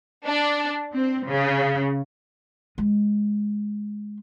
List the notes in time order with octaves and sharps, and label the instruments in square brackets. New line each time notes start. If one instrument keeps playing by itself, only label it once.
[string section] D4
C4
C#3
[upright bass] G#3